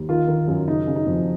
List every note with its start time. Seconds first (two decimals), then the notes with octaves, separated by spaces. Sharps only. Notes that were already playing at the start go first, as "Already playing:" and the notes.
Already playing: D#2
0.09 D#3 F4
0.28 D#3
0.48 F#2
0.67 C#3 D#4
0.87 C#3
0.96 D#4
1.07 F2